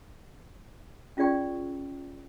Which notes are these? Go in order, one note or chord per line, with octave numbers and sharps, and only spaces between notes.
C#4 F4 G#4 D5 G5 C#6